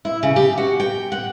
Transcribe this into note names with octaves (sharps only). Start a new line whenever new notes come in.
E4
C#3
G4
F#4
G5
F#5